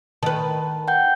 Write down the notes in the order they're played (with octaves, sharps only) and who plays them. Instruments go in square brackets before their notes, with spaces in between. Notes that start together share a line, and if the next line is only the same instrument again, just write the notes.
[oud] D#3 B4 [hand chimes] A5
[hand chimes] F#5 G5 G6